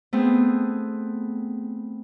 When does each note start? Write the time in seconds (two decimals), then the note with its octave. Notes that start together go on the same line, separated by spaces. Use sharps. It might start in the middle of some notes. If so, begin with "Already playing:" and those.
0.13 A3 B3 C4 G#4